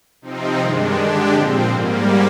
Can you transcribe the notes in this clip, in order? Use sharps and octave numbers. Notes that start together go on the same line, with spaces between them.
C3 F3 C4 D#4
G2 D#3 G#3 D4
D3 G#3 D4 G4
A#2 F3 C4
G#2 G3 A#3